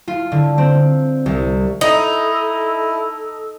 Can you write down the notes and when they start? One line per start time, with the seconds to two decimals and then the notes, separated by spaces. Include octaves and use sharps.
0.08 F4
0.32 D3
0.58 C4
1.26 C2
1.81 D#4 E4 A4 D#5